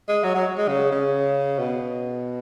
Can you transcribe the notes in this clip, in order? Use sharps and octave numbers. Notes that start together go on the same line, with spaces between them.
G#3
F#3
F#3
G#3
C#3
C#3
B2